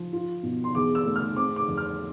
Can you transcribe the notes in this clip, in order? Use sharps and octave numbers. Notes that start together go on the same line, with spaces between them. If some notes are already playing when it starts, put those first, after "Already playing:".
Already playing: F3
F4
B2
C6
E2 D6
E6
A3
F6
C4 D6
D6
F2
F6